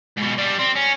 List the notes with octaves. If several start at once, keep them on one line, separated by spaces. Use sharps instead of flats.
G#2 B2
G3 D4
C4
C#4